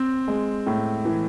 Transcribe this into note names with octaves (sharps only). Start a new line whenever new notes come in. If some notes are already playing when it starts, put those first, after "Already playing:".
Already playing: C4
G#3
A2
E3